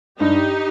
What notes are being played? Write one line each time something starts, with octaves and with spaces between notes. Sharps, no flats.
G2 D#4 G4